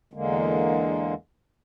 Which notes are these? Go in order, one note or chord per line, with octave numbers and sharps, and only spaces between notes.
E2 D3 G#3 A#3